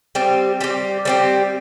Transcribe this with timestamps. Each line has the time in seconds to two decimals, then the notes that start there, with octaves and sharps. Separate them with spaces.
0.15 G3 C4 G4
0.61 G3 C4 G4
1.05 G3 C4 G4